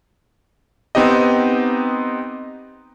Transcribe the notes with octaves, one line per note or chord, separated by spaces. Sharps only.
B3 C4 D#4 G4 D#5